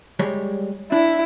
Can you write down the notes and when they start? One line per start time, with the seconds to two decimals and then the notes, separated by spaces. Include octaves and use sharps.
0.19 G3 G#3 C#5
0.92 D4 E4